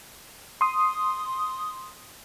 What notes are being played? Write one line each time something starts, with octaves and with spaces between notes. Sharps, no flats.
C6 D#6